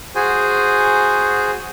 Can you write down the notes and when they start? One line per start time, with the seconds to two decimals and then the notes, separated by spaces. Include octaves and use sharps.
0.15 F#4 G#4 C5 G#5